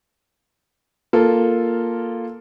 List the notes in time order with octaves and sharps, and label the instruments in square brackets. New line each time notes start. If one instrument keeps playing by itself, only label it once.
[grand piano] A#3 F4 A4